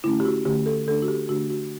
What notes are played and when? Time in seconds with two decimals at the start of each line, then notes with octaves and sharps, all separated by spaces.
0.04 D3 A3 C#4 E4
0.20 G4
0.25 F#4
0.45 D3 A3 C#4 G4
0.66 A4
0.87 D3 A3 D4 A4
1.02 F#4
1.08 G4
1.29 D3 A3 D4 F#4
1.50 F#4